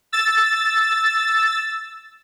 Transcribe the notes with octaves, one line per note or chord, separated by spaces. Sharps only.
E6 A6